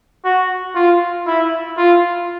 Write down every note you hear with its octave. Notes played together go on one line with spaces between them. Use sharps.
F#4
F4
E4
F4